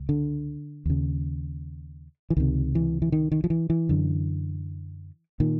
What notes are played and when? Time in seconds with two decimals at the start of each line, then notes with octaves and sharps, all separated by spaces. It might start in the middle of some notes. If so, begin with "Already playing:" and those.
Already playing: C#2
0.09 D3
0.86 D#2 C#3
2.30 E3
2.37 C#2 C3 D#3
2.75 E3
3.02 E3
3.12 D#3
3.32 D#3
3.44 F3
3.50 E3
3.70 E3
3.89 F#2 D3
5.40 A#2 D#3